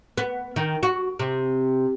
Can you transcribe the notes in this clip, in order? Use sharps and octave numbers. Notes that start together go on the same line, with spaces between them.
B3
D#3
F#4
C3